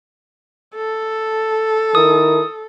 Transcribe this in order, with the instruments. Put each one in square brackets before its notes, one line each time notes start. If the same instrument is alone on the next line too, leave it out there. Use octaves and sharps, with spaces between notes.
[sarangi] A4
[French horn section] D#3 E4 A#4 [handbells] D#6